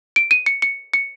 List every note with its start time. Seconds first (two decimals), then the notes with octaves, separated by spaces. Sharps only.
0.16 D7
0.31 D#7
0.46 C#7
0.62 C#7
0.94 C#7